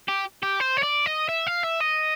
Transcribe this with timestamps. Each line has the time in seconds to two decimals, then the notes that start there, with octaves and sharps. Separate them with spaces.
0.09 G4
0.43 G4
0.60 C5
0.77 C#5
0.83 D5
1.06 D#5
1.29 E5
1.47 F5
1.64 E5
1.81 D#5